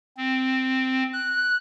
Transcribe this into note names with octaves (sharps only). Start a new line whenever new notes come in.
C4
F#6